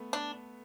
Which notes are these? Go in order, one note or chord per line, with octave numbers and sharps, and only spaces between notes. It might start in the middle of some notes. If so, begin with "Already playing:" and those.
Already playing: A3 B3
D4